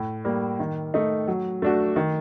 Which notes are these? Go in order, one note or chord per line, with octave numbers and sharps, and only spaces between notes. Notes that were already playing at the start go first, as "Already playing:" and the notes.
Already playing: A2
G3 A#3
D#3
A3 D#4
F#3
A3 D4 F#4
D#3